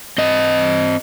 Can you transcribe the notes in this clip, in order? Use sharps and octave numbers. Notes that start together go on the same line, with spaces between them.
C4 D#5